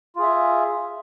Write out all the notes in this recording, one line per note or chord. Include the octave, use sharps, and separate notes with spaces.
F4 G#4 E5